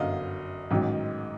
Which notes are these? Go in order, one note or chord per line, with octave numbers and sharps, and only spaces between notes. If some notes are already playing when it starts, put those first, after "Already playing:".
Already playing: G1 F#2 D3 D#5 F5
A1 G#2 D#3 F#3